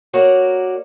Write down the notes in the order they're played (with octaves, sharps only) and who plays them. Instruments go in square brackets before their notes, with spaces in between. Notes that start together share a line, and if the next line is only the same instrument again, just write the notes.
[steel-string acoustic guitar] A#3 F#4 A#4 C#5 D5